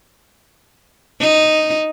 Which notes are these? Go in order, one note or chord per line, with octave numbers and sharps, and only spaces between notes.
D#4